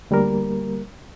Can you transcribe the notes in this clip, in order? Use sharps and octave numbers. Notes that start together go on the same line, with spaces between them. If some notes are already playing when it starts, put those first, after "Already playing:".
D2 G3 A#3 A#4